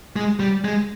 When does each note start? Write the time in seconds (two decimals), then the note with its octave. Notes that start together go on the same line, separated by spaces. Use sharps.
0.16 G#3
0.40 G3
0.65 G#3